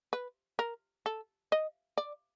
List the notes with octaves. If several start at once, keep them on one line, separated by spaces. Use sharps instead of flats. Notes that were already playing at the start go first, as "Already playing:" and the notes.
B4
A#4
A4
D#5
D5